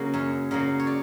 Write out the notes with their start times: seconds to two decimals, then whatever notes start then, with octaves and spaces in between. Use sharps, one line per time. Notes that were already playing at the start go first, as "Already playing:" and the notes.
Already playing: C#3 F#3 A#3
0.14 F#2 C#5
0.51 C#3 F#3 A#3
0.80 C#5
0.87 D5